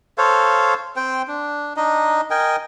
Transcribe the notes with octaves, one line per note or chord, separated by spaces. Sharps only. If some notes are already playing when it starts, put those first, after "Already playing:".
A4 C5 C#5 F5
C4 C5 G5
D4
D4 D#4 D#5
A#4 D#5 G5 G#5